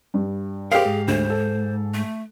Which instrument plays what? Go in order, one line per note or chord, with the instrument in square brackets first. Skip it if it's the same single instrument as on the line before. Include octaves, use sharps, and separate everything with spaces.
[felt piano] G2
[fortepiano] G4 F5 [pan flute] G#4 [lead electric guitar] A#4 C5
[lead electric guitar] G#2
[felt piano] D2 [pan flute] C5
[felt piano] A4
[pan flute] A3